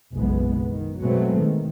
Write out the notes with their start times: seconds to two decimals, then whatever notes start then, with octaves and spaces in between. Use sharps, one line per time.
0.13 F#1 B1 G#3 B3
0.69 D#3
0.99 B2 F#3 G#3 A3 B3 C4
1.39 D#3